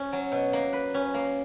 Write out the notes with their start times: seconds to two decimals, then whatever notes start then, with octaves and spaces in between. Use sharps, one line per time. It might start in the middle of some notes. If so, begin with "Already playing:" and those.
Already playing: C#4
0.13 F#3
0.32 B2
0.53 A#3
0.73 B4
0.94 C#4
1.14 A#3